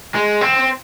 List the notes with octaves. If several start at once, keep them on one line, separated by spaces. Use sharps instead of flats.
G#3
C4